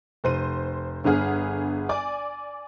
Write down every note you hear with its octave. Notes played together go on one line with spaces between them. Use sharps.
F1 C5 D#7
G1 D3 B3 G#4 F6
D5 G#5 D6